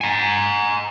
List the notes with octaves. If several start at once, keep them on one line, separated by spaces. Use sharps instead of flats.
G#5 A#5